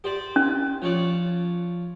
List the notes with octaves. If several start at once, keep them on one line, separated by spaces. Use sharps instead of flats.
G4 C5 D5
C#4
F3 C#5 D5